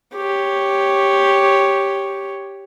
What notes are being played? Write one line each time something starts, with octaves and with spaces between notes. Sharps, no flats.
G4 C#5